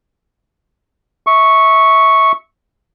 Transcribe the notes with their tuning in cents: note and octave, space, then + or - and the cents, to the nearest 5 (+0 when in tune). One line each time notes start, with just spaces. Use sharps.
E5 -25 C#6 +0